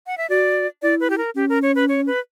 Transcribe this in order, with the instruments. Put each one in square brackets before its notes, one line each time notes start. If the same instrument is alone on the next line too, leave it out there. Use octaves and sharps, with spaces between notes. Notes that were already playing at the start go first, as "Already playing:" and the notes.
[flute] F#5
E5
[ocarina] F#4 [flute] D5
[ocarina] E4 [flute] D5
[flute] B4
G4
A#4
[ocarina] C#4 [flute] G4
[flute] A#4
C#5
B4
C#5
B4